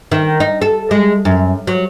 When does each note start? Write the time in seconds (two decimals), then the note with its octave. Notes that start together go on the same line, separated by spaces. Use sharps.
0.12 D#3
0.40 D#4
0.61 A4
0.91 G#3
1.25 F#2
1.67 F#3